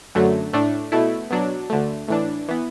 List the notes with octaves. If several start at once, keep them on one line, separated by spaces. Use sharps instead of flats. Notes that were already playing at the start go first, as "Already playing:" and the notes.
F#2 D3 F#3 A3
A2 A3 D4
B2 A3 E4
B2 F#3 D4
D2 D3 A3
A2 E3 D4
E3 B3